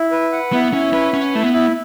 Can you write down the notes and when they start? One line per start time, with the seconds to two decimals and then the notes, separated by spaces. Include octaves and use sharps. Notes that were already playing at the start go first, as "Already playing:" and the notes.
Already playing: E4
0.11 B4
0.32 F#5
0.53 B3 E4
0.72 C#4 E4
0.93 C#4 B4
1.13 C#4 F#5
1.33 A3 E4
1.43 B3
1.53 E4